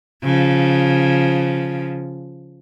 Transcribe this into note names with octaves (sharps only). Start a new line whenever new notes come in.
C#3 F3